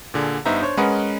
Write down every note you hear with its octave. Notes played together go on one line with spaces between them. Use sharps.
A#2 D3 G#4
G2 B3 D#4 C5 E5 A#5
D4 C5 C#5
G#3 C#4 A#4 B4 D#5 F#5